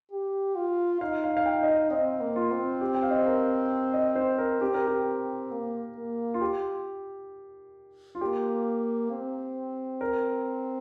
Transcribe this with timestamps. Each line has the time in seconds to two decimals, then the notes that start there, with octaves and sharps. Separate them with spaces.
0.12 G4
0.56 F4
1.01 D#4 F5
1.24 F5
1.37 F5
1.46 G5
1.63 D#5
1.68 F5
1.91 C4 D#5
2.21 A#3
2.36 F4
2.51 C4
2.81 G4
2.95 G5
3.03 F5
3.10 D#5
3.19 C5
3.26 A#4
3.94 D#5
4.16 C5
4.38 A#4
4.61 C4 G4
4.74 A#4
4.87 G4
5.51 A#3
5.97 A#3
6.34 F4
6.41 G4
8.15 F4
8.21 A#3 G4
9.11 C4
10.01 A#4